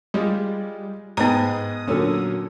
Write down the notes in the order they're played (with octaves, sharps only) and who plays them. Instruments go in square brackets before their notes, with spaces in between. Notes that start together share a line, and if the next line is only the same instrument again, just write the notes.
[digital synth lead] G3 [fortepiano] G#3 [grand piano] F4
[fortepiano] G#2 [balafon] B3 A#5 [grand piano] G#4 B4 G5 [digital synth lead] D#6
[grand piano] A#2 F#3 C#4 [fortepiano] D3 A#3 A4